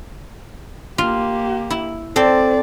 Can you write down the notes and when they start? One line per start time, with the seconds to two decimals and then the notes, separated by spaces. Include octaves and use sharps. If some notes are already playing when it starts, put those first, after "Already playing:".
0.98 A#3 F4 G4
1.70 E4
2.16 C4 A4 C5 D5